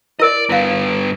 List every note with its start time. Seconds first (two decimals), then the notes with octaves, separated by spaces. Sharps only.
0.20 E4 A#4 D5 D#5
0.49 G2 B3 E4 F5